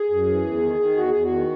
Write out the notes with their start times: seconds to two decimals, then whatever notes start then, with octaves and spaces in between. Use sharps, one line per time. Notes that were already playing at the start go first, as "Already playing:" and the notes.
Already playing: G#4
0.10 F#2
0.27 E3
0.45 E2
0.62 D#3
0.80 D#3
0.97 E2 F#4
1.10 E2 G#4
1.23 F#4
1.32 D#3